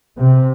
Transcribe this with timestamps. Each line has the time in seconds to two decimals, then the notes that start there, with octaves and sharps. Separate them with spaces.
0.18 C3